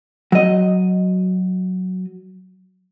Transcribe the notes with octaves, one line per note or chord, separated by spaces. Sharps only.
F#3 D#5